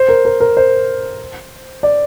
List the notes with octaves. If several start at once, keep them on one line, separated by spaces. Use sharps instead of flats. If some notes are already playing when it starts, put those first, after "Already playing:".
Already playing: C5
A#4
A#4
A#4
C5
D5